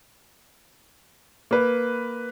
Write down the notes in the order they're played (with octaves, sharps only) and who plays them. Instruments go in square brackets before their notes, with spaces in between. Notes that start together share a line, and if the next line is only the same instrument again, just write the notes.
[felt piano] A#3 B4